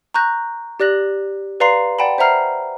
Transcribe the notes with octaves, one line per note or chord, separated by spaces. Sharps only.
A#5 C#6 F#6 G6 A#6
G4 D5 F#6 A#6 F#7
B4 D5 F5 A#5 C6 C7
D5 F#5 G5 A5 B5
C5 E5 F#5 A#5 F6 C7